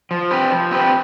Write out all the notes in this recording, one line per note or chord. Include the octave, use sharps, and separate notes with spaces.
F3
C4 G4 B4
F3
C4 G4 B4